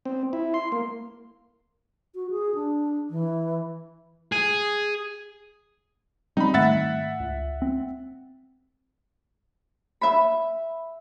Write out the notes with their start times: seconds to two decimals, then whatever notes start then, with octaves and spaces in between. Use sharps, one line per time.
0.05 C4
0.33 E4
0.54 C6
0.72 A#3
2.15 F#4
2.30 G#4
2.55 D4
3.10 E3
4.32 G#4
6.37 G3 C4 D#4 B5
6.54 G#2 D#3 A3 E5 F#5 A6
7.20 C#2
7.62 C4
10.01 E5 B5